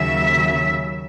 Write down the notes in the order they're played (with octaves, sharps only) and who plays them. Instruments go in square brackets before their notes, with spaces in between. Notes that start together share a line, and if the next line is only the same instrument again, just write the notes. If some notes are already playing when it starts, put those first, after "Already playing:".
Already playing: [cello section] D#2 C#3 F#3 E5